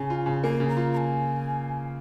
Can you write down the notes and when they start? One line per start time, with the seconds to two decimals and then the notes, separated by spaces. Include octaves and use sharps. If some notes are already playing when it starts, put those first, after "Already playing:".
Already playing: C#3 G#5
0.10 F4
0.26 C#3
0.43 A#3 G#5
0.60 C#3
0.69 A#5
0.77 F4
0.93 A#5
0.97 G#5